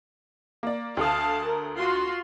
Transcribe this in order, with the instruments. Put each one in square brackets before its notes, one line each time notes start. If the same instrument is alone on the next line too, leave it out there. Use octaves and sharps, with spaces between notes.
[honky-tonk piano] A#3 D5
[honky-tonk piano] D2 A4 D#6 [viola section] F5 A5
[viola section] A#4
F4 F#4 C6